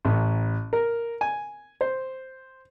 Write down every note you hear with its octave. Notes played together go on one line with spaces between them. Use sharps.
A1
A#4
G#5
C5